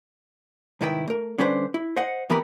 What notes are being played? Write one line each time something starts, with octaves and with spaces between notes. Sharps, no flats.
C2 G#2 D#3 E4 B4 G5
A3 A#4
D3 G3 C#4 D4 B4 C5
E4
C5 D#5 F#5
F2 E3 B3 G4 A#4 B5